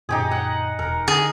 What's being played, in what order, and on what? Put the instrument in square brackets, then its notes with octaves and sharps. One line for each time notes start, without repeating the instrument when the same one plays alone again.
[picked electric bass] F#2 A#2 D3 [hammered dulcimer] D#4 G4 G#4
[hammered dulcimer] F#5
[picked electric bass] E1 [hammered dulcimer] A#4
[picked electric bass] D3 [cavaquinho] G#4